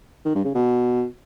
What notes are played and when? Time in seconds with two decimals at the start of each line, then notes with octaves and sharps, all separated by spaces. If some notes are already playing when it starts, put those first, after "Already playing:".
0.25 D#3
0.35 G2
0.45 C#3
0.55 B2